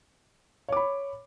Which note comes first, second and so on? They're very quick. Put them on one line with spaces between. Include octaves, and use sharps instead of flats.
C#5 D6 B5